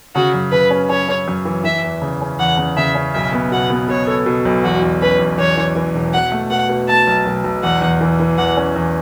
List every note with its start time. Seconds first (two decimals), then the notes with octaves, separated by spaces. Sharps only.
0.15 C#3 F#4
0.34 F#2
0.52 C#3 B4
0.71 C#4
0.89 C#4 C#5
1.09 C#4
1.28 F#2
1.45 E3
1.64 E3 E5
1.83 E2
2.02 C#3
2.21 C#4
2.39 E2 F#5
2.57 C#3
2.77 C#3 E5
2.95 C#4
3.14 B1 E5
3.32 B3
3.52 B2 F#5
3.70 B3
3.88 B2 C#5
4.07 A4
4.26 B2
4.45 B1
4.63 E2 F#4
4.82 E2
5.01 C#4 B4
5.19 E2
5.38 E2 C#5
5.57 E3
5.76 E3
5.94 E1
6.13 B2 F#5
6.32 A3
6.50 B2 F#5
6.69 B2
6.88 A3 A5
7.07 B1
7.26 B1
7.44 B1
7.63 E2 F#5
7.82 E2
8.01 E3
8.20 E3
8.38 E2 F#5
8.57 C#4
8.76 E2